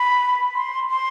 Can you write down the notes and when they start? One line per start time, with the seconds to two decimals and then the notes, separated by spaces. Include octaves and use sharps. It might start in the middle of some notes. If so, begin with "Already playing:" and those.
Already playing: B5
0.55 C6
0.89 C6